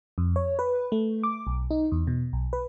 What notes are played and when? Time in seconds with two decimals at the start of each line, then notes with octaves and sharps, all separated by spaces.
0.18 F2
0.36 C#5
0.59 B4
0.92 A3
1.23 D6
1.47 B1
1.71 D#4
1.92 E2
2.07 B2
2.33 B1
2.53 B4